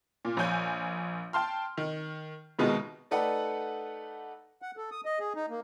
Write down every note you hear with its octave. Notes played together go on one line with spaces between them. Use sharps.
A#2
A#1 C#5 G#5 G6
G5 A5 C6 F6
D#3
C2 B2 D#3 G#3 B3
A3 D#4 A4 B4 D5 F#5
F#5
A4
D#6
D#5
G#4
D#4
A#3